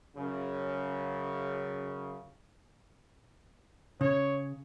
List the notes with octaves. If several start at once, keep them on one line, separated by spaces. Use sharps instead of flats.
F#2 C#3
C#3 C#5